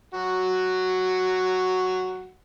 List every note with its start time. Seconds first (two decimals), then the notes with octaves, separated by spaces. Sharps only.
0.14 F#3 F#4